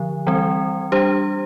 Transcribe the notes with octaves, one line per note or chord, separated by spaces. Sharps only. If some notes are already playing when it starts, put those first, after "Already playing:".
Already playing: D3 F3
E3 G3 C4
G3 D4 G4 C5